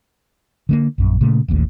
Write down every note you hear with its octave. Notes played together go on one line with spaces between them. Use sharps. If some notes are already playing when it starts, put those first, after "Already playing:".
D3 A3 A#3
A#1 F#2
A#2 C#3 A3
D#1 A1 D#2 A2